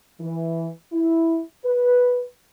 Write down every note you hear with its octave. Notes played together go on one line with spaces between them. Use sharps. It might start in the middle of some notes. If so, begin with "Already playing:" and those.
E3
E4
B4